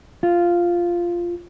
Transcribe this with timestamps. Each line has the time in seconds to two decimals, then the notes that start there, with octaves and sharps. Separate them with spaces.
0.23 F4